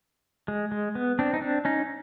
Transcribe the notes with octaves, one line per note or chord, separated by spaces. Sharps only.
G#3
G#3
B3
C4 D4
D#4
C4 D4
C#4 D#4